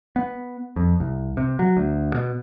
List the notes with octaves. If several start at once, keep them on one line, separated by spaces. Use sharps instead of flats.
B3
F2
C2
C3
F#3
D2
B2